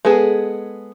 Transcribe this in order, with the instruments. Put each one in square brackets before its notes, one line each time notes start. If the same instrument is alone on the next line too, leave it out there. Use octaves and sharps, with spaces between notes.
[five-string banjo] G#3 B3 G#4 A4